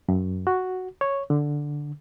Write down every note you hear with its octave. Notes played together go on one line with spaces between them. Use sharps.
F#2
F#4
C#5
D3